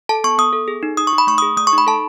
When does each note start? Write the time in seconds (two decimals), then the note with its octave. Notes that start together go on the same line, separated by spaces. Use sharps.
0.09 A4 A5
0.24 B3 C#6
0.38 B3 D#6
0.53 A4
0.68 G#4
0.83 D#4
0.97 D#4 D#6
1.07 C#6
1.13 D#4
1.18 B5
1.27 A3 C#6
1.38 D#6
1.42 G#4
1.57 A3 D#6
1.67 C#6
1.73 D#4
1.78 B5
1.87 A4 A5